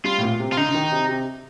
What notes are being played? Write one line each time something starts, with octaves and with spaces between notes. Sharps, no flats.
G3 F4
A2
A#2
C3
F4
D3 D#4
D3
D#3
C3
C3